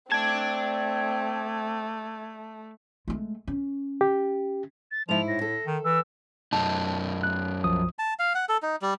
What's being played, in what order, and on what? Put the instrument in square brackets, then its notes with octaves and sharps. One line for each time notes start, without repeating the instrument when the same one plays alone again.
[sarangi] A3 [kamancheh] C4 [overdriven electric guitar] D5 A5 [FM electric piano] G#6
[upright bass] G#3 A3
C#4
[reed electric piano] G4
[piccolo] A6
[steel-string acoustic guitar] G#2 E4 [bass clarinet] F3 [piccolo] F7
[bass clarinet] A2 [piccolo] A#6
[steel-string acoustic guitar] A4
[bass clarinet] D#3
[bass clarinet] E3 [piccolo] E6
[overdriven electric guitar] F#2 D#4 [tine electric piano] A5
[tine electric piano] F#6
B1 F3 D#6
[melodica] A5
F5
F#5
A4
D#4
G3